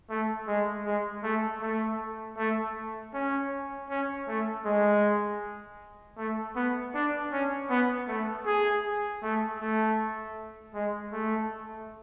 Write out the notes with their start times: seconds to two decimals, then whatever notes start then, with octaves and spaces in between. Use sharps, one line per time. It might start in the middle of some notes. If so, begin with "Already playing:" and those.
0.10 A3
0.48 G#3
0.86 G#3
1.23 A3
1.62 A3
2.38 A3
3.14 C#4
3.90 C#4
4.28 A3
4.66 G#3
6.18 A3
6.56 B3
6.94 D4
7.32 C#4
7.70 B3
8.08 A3
8.46 G#4
9.23 A3
9.60 A3
10.75 G#3
11.13 A3